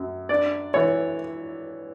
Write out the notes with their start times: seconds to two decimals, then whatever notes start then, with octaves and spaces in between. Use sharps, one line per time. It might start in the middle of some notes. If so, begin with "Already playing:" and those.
Already playing: F#2
0.29 D4 D5
0.74 E3 C#5